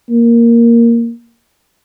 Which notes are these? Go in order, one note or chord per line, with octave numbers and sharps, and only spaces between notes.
A#3